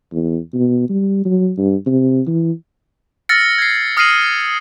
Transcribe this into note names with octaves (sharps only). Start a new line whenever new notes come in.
E2
B2
G3
F#3
G2
C3
E3
E6 F6 A6 A#6 C#7
G#6 C7
D#6 F6 A#6 C7 D#7 F#7